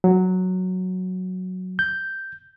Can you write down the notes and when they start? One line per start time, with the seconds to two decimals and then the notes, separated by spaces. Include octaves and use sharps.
0.04 F#3
1.79 G6